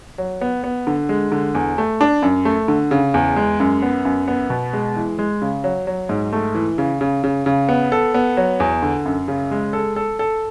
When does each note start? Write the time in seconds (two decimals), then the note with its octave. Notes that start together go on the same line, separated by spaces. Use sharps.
0.18 F#3
0.41 B3
0.64 B3
0.87 D3
1.09 G#3
1.32 D3
1.55 E2
1.78 A3
2.01 D4
2.22 F#2
2.45 A3
2.68 D3
2.91 C#3
3.14 E2
3.36 G#3
3.60 F#2
3.82 B3
4.05 F#2
4.28 B3
4.50 B2
4.73 G#3
4.96 E3
5.19 G#3
5.42 C#3
5.64 F#3
5.87 F#3
6.09 G#2
6.33 A3
6.55 E3
6.78 C#3
7.01 C#3
7.24 C#3
7.46 C#3
7.69 B3
7.92 A4
8.14 B3
8.37 F#3
8.60 E2
8.83 D3
9.06 F#2
9.28 C#3
9.51 G#3
9.73 A4
9.96 A4
10.19 A4